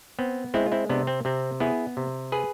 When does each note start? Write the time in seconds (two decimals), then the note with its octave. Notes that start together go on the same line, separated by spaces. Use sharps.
0.19 B3 C4
0.54 G#3 C4 E4
0.66 F4
0.72 C4 E4
0.89 C3 B3 D4
1.07 C4
1.25 C3 C4
1.60 B3 E4 G#4
1.97 C3
2.32 G#4 B4